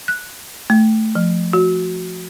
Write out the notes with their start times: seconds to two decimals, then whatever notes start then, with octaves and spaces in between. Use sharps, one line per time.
0.08 F#6
0.70 A3
1.15 F3
1.53 F#4